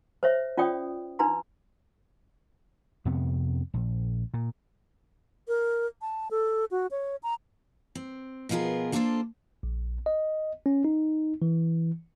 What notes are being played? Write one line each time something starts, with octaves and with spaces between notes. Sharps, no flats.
C5 C#5 E5
C#4 F4 C#5 D5 G5 D#6
D4 D#4 B4 A#5 C6
F2 C3 B3
A#1
A#2
A#4
A5
A4
F#4
C#5
A#5
C4
B2 F3 B3 F4 G#4 A#4
A#3 D4 F4 G#4 A4 C5
A#1
D#5
C#4
D#4
E3